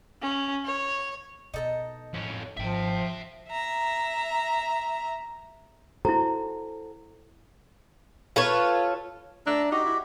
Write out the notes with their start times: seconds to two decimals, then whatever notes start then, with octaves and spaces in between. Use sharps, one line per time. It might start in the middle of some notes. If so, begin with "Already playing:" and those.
0.22 C#4
0.65 C#5
1.54 B2 D#4 A4 A#5
2.14 A1 F2 C#4
2.57 G#1 F3 E5 G5
3.49 E5 A#5
6.05 E4 F#4 A4 C5 A#5
8.36 F4 A4 B4 C#5
9.46 A3 D4 A#5 E6
9.72 D#4 F#4 G4
9.85 E4